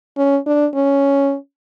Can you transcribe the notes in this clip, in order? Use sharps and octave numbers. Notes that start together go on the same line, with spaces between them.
C#4
D4
C#4